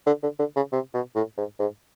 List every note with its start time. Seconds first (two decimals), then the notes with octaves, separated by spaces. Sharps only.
0.07 D3
0.23 D3
0.39 D3
0.56 C#3
0.73 C3
0.94 B2
1.15 A2
1.37 G#2
1.60 G#2